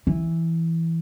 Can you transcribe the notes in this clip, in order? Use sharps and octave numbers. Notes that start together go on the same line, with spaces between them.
E3